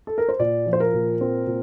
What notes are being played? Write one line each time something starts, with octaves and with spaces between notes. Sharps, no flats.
A4
A#4
C5
A#2 D5
F3
C5
A#4
A#2
C4
A#2